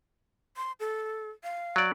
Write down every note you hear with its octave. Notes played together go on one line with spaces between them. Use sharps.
C6
A4
F5
F#3 D5